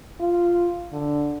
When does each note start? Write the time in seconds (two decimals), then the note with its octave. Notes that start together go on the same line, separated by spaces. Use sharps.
0.20 F4
0.92 D3